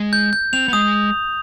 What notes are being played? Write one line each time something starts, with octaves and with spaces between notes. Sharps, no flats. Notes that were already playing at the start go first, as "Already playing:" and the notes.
Already playing: G#3
G6
G6
C4 F7
B3
G#3 D#6